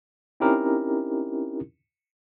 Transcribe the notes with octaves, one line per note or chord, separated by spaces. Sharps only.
C4 C#4 D#4 E4 G4 A#4